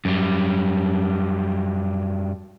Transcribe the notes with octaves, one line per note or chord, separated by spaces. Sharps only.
F#2 G3